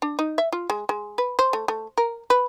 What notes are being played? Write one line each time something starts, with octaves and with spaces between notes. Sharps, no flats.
D4
D#4
E5
F4
G#3
G#3
B4
C5
A3
A3
A#4
B4